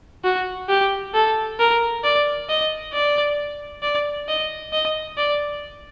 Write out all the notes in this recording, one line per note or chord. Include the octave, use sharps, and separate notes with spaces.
F#4
G4
A4
A#4
D5
D#5
D5
D5
D#5
D#5
D5